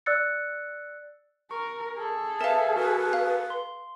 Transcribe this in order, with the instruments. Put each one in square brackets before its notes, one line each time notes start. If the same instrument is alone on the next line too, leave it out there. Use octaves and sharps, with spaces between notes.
[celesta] D5 E6 F#6 A6 C#7
[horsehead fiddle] A#4 [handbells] C#6
[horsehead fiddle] G#4 A4
[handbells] A#4 B4 [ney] E5 [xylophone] F5 A5
[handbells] F#4 A#4 [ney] B4
[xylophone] F5
[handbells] C6